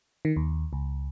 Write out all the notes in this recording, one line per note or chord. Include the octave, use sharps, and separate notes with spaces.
D#3
D#2
C#2